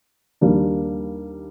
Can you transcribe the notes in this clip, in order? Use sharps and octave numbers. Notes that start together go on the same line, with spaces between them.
D#2 D#3 G3 A#3 D4